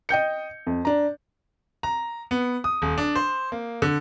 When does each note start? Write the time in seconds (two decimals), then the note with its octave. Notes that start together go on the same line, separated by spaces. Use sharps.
0.09 D#5 G5 G6 C#7
0.67 F2
0.85 D4 A#5
1.83 A#5
2.31 B3
2.64 D#6
2.82 D#1
2.98 D4
3.15 C5
3.52 A#3
3.82 D3